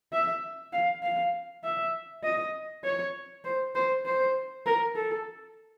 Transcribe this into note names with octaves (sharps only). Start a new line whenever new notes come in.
E5
F5
F5
E5
D#5
C#5
C5
C5
C5
A#4
A4